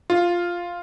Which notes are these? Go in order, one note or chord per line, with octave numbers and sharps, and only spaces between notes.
F4